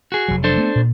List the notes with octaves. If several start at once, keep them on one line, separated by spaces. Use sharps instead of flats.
F#4 G#4
F1 F#3
D4 A4 C5
A3 B3
A#2